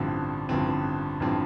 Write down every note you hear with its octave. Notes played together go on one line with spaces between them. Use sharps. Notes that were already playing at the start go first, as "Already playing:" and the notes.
Already playing: A1 G2 D3 F3 C4
A1 G2 D3 F3 C4
A1 G2 D3 F3 C4